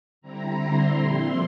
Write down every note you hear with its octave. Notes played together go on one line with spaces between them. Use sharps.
D3 G3 C4 E4 A#5
C6
A#2 F3 C4 E4 C6